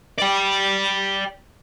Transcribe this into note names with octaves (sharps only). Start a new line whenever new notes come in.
D5 G5